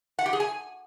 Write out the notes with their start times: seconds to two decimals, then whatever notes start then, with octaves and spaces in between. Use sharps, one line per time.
0.19 F#5
0.26 G4
0.33 G#4
0.40 G#5